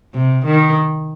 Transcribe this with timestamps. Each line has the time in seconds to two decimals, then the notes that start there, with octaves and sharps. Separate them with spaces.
0.14 C3
0.45 D#3